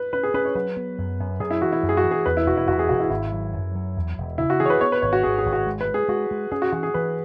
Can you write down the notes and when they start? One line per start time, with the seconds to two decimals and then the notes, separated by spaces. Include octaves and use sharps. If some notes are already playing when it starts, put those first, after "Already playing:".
Already playing: B4
0.13 C#4 B4
0.23 G#4
0.34 C#4 B4
0.45 C#5
0.55 F#3 B4
0.77 B3
0.98 F#2
1.20 F#2
1.40 F#2 G#4
1.51 E4
1.62 E3 F#4
1.72 E4
1.83 F#2
1.89 G#4
1.97 F#4
2.04 E3
2.11 G#4
2.26 E2 B4
2.37 E4
2.46 E1 F#4
2.57 E4
2.68 E1 F#4
2.79 G#4
2.89 E1 F#4
3.00 E4
3.10 G#1 E4
3.32 F#3
3.53 F#2
3.75 F#3
3.97 E2
4.18 E1
4.38 C#3 E4
4.50 F#4
4.60 E3 G#4
4.66 C#5
4.70 B4
4.81 B3 C#5
4.92 B4
5.02 G#1 C#5
5.13 F#4
5.23 G#1 G#4
5.38 G#4
5.46 G#1
5.53 F#4
5.67 G#3
5.81 B4
5.88 G#3
5.94 G#4
6.08 G#3 F#4
6.31 G#3
6.51 C#4 G#4
6.62 F#4
6.72 E3 F#4
6.83 G#4
6.94 E3 B4